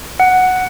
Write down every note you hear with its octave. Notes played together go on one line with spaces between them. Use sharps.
F#5